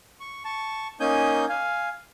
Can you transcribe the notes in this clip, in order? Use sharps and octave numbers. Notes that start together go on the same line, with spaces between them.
C#6
A5 C#6
A#3 C#4 D#4 G#5 D#6 G6
F5 G#5